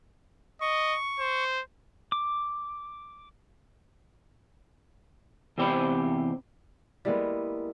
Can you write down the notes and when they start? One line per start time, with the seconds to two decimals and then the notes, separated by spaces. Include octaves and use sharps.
0.61 D#5 C#6
1.20 C5
2.12 D6
5.58 E2 C3 C4 G4 C5 B5
7.05 G3 G#3 A#3 B3 E4